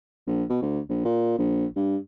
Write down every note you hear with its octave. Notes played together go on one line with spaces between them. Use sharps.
A#1
B2
D2
A#1
A#2
A#1
G2